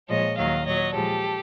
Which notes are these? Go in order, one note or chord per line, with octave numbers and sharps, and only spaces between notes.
A#2 F3 G#3 C#5 D#5
D#2 D#3 F#3 D#5 F5
A#2 F#3 C#5 D#5
A#2 F3 G#3 G4 A4